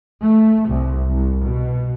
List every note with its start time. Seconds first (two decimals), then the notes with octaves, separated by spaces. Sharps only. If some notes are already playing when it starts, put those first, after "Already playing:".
0.23 A3
0.70 C2
1.11 C2
1.44 B2